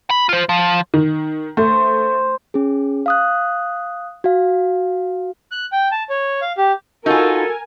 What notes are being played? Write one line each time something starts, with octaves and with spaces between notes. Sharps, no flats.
B5
F4 C5
F3
D#3
A3 C5
C#4 G#4
F5 D#6 F#6
F#4 F5
F#6
G5
A5
C#5
F5
G4
D#4 F4 F#4 A4 A#4 G#5